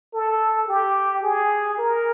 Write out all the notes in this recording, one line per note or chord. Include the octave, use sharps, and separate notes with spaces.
A4
G4
G#4
A#4